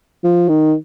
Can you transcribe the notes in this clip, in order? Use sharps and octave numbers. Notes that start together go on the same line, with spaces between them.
F3
D#3